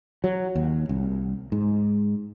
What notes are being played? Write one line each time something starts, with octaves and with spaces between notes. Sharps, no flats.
F#3
D#2
C2
G#2